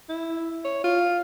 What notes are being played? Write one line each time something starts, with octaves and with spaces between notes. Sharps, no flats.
E4
C#5
F4